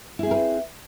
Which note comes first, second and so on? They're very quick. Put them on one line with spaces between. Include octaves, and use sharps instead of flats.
E4 G#4 C4 A#4 B4